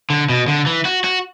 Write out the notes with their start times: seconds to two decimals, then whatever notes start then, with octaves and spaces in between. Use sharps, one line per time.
0.10 D3
0.30 B2
0.48 D3
0.67 E3
0.85 F#4
1.04 F#4